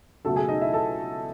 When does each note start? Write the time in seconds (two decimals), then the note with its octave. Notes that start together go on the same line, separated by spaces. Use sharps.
0.25 C#2 B2 F#3 A3 A4 A5
0.36 G#4 G#5
0.49 D#4 D#5
0.61 E4 E5
0.73 A4 A5